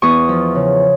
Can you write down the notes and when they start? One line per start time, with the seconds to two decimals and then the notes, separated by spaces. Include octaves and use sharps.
0.02 E2 C#6 D#6
0.29 F3
0.55 C#3